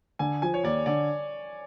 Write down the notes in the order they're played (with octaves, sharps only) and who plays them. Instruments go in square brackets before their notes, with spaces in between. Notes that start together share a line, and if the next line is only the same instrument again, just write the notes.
[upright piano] D3 [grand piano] G#5
[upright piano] F3 [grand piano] G#5
[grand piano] C#5
[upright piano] D#2 [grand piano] D5
[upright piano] D3 [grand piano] D5